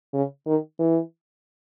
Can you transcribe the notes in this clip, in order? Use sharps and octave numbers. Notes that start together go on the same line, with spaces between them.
C#3
D#3
E3